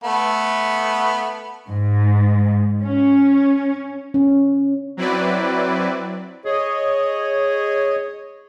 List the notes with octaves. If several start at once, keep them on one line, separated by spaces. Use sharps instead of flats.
A3 B3
G#2
C#4
C#4
F#3 C4 E4 B4 D5
G#4 C#5 D#5